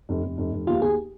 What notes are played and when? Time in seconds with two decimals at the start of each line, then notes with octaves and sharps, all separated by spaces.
0.09 F1
0.24 F1
0.38 F1
0.52 F1
0.67 D#2 F4
0.82 D#2 G#4